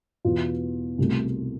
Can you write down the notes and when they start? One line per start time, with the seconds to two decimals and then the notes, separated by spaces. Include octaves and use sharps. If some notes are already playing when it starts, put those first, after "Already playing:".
0.25 E2 B2 B3 F4
0.98 C2 B2 A3